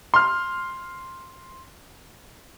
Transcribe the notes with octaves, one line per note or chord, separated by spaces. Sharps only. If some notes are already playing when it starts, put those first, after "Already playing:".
C6 F6